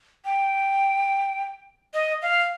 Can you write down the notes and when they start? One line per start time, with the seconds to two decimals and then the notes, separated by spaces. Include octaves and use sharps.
0.25 G5
1.94 D#5
2.22 F5